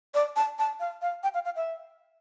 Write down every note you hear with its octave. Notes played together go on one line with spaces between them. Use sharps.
D5
A5
A5
F5
F5
G5
F5
F5
E5